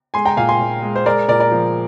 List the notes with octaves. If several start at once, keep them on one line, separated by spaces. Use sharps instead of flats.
G#3 G#5 C6
G5 A#5
A#2 F5 G#5
G#5 C6
A#2
G#3
C5
G#3 A#4 D5
A#2 A#4 D5
A#4 D5
F3